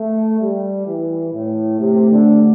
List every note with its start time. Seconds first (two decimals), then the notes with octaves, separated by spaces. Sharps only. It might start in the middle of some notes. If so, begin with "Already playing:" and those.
Already playing: A3
0.40 G3
0.87 E3
1.34 A2
1.80 C3 A3
2.11 D3